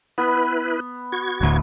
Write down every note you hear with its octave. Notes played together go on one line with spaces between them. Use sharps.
B3 E4 B4
F#4 G#6
D1 D2